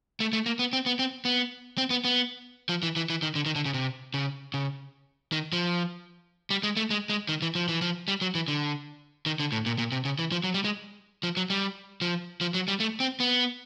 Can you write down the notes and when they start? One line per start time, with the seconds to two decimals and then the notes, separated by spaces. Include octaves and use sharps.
0.20 A3
0.33 A3
0.46 A#3
0.59 B3
0.73 C4
0.86 B3
0.99 C4
1.25 B3
1.78 C4
1.90 B3
2.05 B3
2.69 F3
2.83 E3
2.96 E3
3.10 E3
3.22 D#3
3.35 D3
3.46 D#3
3.55 D3
3.65 C#3
3.74 C3
4.14 C#3
4.54 C#3
5.32 D#3
5.53 F3
6.50 G3
6.63 G#3
6.77 A3
6.90 G#3
7.09 G#3
7.29 D#3
7.42 E3
7.55 F3
7.68 E3
7.82 F3
8.08 G3
8.21 F#3
8.35 E3
8.48 D3
9.26 D#3
9.40 D3
9.52 A2
9.66 A#2
9.78 A#2
9.92 C3
10.05 C#3
10.19 E3
10.32 F3
10.44 F#3
10.54 G3
10.64 G#3
11.23 F3
11.37 F#3
11.50 G3
12.01 F3
12.41 F3
12.54 F#3
12.68 G3
12.80 A3
13.00 C4
13.20 B3